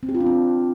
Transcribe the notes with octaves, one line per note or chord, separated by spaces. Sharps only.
C4
G4
F4
D4
C4